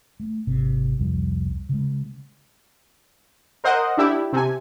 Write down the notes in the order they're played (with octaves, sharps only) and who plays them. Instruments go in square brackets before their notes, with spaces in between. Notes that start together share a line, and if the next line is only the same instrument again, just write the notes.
[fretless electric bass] A3
G#1 C3
C2 F2 F3 G3
C#3 G#3
[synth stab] A#4 C5 D#5 F#5
D4 E4 G4
C3 G#5